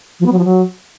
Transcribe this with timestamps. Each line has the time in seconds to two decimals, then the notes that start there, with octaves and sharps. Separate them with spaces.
0.20 F3
0.26 B3
0.32 F#3
0.38 F3
0.45 F#3